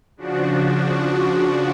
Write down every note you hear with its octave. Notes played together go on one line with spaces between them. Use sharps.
C#3 F3 D4 F#4